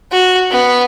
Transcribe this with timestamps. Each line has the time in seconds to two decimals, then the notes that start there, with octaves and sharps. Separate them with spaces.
0.12 F#4
0.51 B3